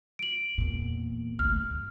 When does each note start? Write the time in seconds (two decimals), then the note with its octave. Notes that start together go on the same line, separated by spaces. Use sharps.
0.19 D7 F#7
0.58 E2 A#2
1.39 G1 D2 F6
1.56 G2